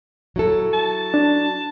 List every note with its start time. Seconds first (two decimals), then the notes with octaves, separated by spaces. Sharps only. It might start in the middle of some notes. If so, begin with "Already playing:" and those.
0.36 F#3 E4 A4
0.73 A5
1.14 D4